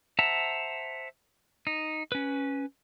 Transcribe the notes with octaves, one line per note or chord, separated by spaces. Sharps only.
C5 E5 F#5 A5 A#5
D#4
C#4 B4